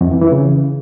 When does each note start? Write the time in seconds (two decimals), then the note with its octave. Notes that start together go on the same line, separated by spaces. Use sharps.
0.01 F2
0.11 E3
0.22 E3
0.32 C#3